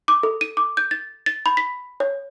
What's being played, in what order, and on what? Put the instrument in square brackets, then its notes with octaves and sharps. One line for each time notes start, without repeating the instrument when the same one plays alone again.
[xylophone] D6
A4
D#7
D6
G6
A6
A6
B5
B6
C#5